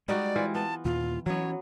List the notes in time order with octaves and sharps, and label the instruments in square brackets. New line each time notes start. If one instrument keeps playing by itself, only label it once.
[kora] G3 D#4 F#4 [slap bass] G#3 [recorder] D5
[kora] E3 C4 F4
[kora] B3 [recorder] A5
[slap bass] D#2 A#2 [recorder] F4
[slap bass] E3 C#4 [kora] F#3 B3 [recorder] C#5